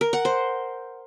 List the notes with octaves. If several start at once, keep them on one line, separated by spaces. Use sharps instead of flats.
A#4
F#5
C5